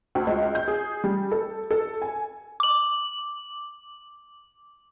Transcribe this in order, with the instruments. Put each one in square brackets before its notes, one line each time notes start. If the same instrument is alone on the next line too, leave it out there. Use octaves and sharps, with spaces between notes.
[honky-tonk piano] D2
C#2
G6
G#4
G3
A4
A4
G#5
[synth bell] D6 F#7